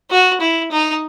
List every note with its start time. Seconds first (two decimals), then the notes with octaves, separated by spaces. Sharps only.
0.11 F#4
0.41 E4
0.72 D#4